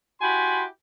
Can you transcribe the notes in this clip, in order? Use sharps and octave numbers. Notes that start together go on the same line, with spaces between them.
E4 F#4 G4 G#5 B5 C6